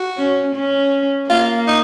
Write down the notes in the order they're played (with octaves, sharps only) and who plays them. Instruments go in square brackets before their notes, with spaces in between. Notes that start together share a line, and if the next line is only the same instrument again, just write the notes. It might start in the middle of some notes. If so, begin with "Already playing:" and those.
Already playing: [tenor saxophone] F#4
[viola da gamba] C#4
C#4
[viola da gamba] A#3 [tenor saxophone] F4
[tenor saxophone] D#4